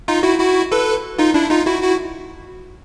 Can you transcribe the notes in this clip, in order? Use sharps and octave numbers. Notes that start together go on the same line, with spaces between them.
D#4 F4
E4 F#4
E4 F#4
A4 B4
D#4 F4
D4 E4
D#4 F4
E4 F#4
E4 F#4